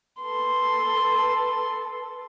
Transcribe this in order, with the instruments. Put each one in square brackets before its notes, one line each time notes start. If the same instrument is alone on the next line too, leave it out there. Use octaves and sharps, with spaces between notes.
[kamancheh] A4 B4 [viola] C6